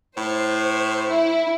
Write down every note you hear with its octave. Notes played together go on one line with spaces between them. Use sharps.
A2 C5
E4